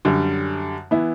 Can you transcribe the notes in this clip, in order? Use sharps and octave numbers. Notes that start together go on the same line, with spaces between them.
F#2 D3 G3
E3 B3 E4